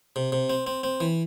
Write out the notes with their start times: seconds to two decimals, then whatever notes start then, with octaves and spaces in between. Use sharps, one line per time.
0.16 C3
0.32 C3
0.50 C4
0.67 C4
0.84 C4
1.00 E3